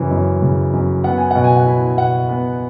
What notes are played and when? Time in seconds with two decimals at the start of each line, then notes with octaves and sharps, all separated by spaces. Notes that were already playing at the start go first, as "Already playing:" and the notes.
Already playing: F#2 C#3 E3
0.11 F#2
0.42 C#3
0.73 F#2
1.04 B3 F#5
1.18 G#5
1.31 B2 F#5
1.44 G#5
1.57 F#5
1.66 E4
1.98 B2 F#5
2.29 B3